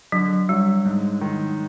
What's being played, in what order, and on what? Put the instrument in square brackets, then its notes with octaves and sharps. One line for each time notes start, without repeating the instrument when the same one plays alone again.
[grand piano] D3 [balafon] F#3
[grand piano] F#3 [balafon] G3
[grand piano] G#2
D#3